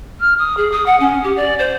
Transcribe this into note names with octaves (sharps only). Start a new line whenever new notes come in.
F6
D#6
G#4
D#6
F#5
C#4
G4
D5
C5